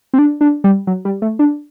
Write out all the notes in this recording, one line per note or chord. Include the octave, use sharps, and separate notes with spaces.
C4
D4
D4
G3
F#3
G3
A3
D4